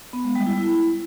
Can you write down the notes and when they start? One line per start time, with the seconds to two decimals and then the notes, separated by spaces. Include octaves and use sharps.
0.13 B3
0.24 G#3
0.35 G3
0.47 E4
0.58 E4